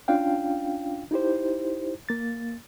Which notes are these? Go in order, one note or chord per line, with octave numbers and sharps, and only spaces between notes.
C#4 D4 F4 F5 G5
D#4 E4 G4 C5
A#3 A6